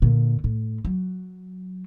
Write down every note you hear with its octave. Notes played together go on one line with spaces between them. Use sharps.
A#2 D3
A2
F#3